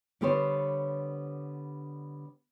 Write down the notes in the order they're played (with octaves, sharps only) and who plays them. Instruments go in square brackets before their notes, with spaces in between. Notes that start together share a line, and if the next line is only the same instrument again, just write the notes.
[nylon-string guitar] D3 G3 B3 G4 C5 C#5